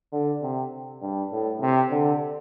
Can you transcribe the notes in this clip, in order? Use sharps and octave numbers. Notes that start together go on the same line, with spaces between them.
D3
C3
G2
A2
C3
D3